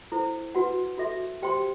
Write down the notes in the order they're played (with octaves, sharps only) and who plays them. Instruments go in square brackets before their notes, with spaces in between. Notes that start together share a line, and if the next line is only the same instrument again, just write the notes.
[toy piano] E4 A4 C5
F#4 B4 F#5
F#4 A4 E5
G4 C5 G5 C6